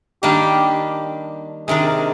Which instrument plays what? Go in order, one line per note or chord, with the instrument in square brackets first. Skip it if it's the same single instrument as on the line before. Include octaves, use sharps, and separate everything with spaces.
[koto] D#3 G3 A#3 D4 [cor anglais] G4
[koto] C3 D#3 G#3 D4 [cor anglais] G#4
[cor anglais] A#4